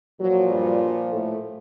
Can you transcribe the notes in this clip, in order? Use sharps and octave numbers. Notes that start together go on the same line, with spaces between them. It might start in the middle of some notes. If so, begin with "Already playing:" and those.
A#2 F3 F#3
G2 G3
A2 A3